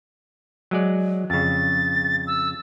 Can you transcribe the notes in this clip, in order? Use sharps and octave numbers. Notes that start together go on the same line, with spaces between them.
F#3 G#3 D5
F2 C#3 A6
E6